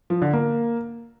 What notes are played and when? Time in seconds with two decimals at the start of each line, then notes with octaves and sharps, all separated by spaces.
0.10 F3
0.22 D3
0.33 A#3